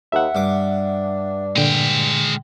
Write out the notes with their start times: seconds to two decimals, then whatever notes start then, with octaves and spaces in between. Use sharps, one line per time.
0.12 D#2 E5 F#5
0.35 G2 D4 D6
1.56 A#2 D3 G#3 G5